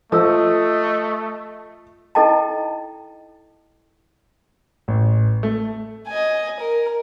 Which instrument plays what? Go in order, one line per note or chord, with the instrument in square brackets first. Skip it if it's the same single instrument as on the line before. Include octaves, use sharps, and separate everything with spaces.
[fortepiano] F3 [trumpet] A3 [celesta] A4 E6 [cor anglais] D#5
[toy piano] D#4 E4 A4 D#5 G5 A5
[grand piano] A1
A3
[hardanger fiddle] D#5 G#5
A#4